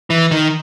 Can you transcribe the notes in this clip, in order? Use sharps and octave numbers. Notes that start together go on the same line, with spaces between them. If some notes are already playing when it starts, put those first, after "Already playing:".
E3
D#3